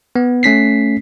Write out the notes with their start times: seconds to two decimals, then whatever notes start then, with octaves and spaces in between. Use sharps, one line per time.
0.16 B3
0.43 A3 C#4 B6 C7